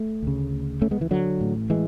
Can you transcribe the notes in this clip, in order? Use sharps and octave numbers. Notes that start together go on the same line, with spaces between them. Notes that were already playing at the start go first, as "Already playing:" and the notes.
Already playing: A3
D2 C#3
A3 C#4
G#3 B3
E3
D3 F#3
A1 A2
E3 G#3